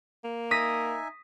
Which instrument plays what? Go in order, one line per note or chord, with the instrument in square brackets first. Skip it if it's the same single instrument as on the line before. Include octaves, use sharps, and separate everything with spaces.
[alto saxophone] A#3
[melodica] D#4 E5 G#5 [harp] D#6 A#6 B6